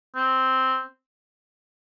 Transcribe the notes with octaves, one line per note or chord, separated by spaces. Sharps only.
C4